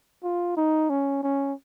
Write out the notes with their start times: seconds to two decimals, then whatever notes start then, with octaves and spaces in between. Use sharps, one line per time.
0.23 F4
0.57 D#4
0.90 C#4
1.23 C#4